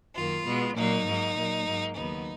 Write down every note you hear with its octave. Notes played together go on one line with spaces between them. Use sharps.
F#2 D#3 A#3 F4
B2 G#3 B3
A#2 F#3 A#3 D#4
G#2 F#3 A#3
A#2 F#3 A#3
G#2 F#3 A#3
D#2 C#3 F#3 B3 D#4